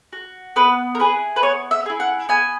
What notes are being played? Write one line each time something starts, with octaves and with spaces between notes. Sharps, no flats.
F#4
B3 B4
A#4
E4 G#4 B4
B4
B3 C#5
E5
E4 G#4
F#5
B3 G#5